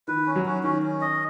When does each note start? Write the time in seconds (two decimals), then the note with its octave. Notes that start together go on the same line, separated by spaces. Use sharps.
0.08 D#3 B4
0.26 C#4
0.36 F#3
0.46 C#4
0.63 D#3 C#4
0.82 C#4
1.01 D#5